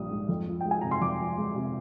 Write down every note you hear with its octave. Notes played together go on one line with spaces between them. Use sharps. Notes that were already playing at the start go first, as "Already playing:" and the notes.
Already playing: A#1 G3 D#6
G#2
F2
F3
G#3 G5
G#5
C3 A#5
C6
F2 D6
F3
G#3
C3